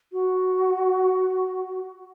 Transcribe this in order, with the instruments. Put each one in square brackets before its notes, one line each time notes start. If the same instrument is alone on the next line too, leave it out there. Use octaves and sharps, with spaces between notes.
[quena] F#4